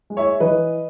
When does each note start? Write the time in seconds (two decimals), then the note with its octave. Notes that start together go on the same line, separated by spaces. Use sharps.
0.10 G#3
0.17 C#5 E5
0.40 E3 B4 D#5